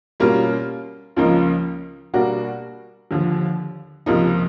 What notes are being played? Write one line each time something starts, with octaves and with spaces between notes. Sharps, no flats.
B2 G3 A#3 C#4 F4
C#2 C#3 F3 A#3 D#4
B2 G3 A#3 D4 F#4
D#2 D3 F3
C#2 C3 F3 A#3 D#4